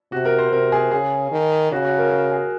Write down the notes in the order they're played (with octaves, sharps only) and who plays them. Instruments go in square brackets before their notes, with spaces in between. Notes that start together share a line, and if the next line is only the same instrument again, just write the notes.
[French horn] C3 [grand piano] F#4
[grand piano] A#4
C5
[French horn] C3 [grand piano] A#4
[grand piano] G#4
[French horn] C#3 [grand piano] G#4
[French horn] D#3
[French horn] C#3 [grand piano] F#4
[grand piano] F#4
A#4
A#4
G#4